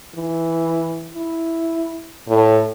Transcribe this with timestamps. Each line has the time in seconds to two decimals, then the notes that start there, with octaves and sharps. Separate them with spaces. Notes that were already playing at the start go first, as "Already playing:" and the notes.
0.16 E3
1.14 E4
2.29 A2